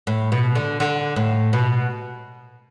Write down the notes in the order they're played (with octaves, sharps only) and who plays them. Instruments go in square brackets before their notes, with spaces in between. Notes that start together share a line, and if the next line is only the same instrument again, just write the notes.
[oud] A2
B2
D3
D3
A2
B2